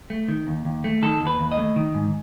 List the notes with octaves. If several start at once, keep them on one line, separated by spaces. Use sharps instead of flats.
A3
D#3
D#2
D#2
A3
D#3 A4
D#2
B4
D#2
D#5
A3
D#3
G#2